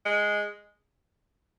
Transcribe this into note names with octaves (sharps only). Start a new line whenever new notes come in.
G#3